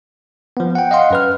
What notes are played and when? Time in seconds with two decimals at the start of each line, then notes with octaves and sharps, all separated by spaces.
0.57 F3 B3
0.75 F#5 G5
0.91 D#5 F5 F#5 C6
1.11 F#2 B4 F6